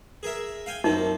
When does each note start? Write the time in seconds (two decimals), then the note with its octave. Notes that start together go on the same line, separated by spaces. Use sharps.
0.23 G#4 A#4 E5
0.66 F5 G5 G#5
0.84 F#2 A#3 C4 D#4